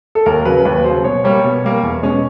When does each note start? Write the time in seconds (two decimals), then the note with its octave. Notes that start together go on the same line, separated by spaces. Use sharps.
0.15 A4
0.26 D#2 A#4
0.42 A#4
0.45 C#3 F#3 B4
0.65 D#2 B4
0.84 C#3 F#3 C5
1.04 B2 C#5
1.24 G3 A#3 C#5
1.44 B2
1.64 G3 A#3
1.83 E2
2.03 B2 G#3 C#4